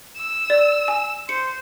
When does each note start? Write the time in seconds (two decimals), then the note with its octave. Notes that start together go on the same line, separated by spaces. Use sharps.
0.18 E6
0.50 D5
0.88 G#5
1.29 C5 C#7